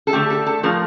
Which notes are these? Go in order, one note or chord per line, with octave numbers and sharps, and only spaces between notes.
A4
D3 A3 G4
A4
A4
A2 F3 A3 A#4